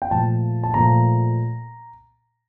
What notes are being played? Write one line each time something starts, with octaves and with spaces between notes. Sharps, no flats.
G5
A#2 F3 A3 A5
A5
A#2 F3 A3 A#5